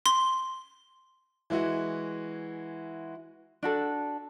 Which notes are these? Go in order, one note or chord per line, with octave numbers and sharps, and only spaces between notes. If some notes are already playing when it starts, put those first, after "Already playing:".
C6
E3 G#3 E4 F#4
D4 F#4 A4